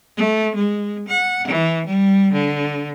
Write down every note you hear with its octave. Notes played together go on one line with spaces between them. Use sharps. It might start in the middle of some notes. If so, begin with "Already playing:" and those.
A3
G#3
F#5
E3
G3
D3